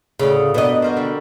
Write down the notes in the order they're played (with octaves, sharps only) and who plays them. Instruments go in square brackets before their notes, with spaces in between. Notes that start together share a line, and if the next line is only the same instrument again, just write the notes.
[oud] D2 C#3 [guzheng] A2
[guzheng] G2 A#3 [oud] B2 D#5
[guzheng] F#4 A#4 C5
D3 G3